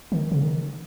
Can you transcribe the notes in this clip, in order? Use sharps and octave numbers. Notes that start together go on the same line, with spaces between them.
D#3
C#3
D#3